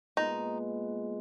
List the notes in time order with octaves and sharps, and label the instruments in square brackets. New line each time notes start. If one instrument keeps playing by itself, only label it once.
[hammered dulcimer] A#2 G#3 B3 [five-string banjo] D#4